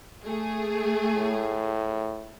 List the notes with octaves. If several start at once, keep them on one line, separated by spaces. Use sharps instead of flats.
A3 G#4
A2